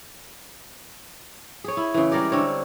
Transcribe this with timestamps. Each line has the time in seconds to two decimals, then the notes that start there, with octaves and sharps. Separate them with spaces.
1.64 G#4 C#5
1.77 E4
1.94 C#3 E3
2.12 G3 G#3 A#4 D5
2.32 D3 C4 C#5